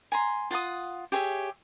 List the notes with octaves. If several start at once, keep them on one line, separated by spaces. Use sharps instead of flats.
G#5 A#5 C6
F4 F#5 A5 D#6
G4 G#4 C#5 E5